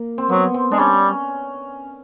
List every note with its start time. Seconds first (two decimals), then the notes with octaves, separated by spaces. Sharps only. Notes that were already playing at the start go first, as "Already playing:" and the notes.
Already playing: A#3
0.18 C4
0.29 F#3 B3
0.54 C4
0.72 G#3 D4
0.79 G3 C#4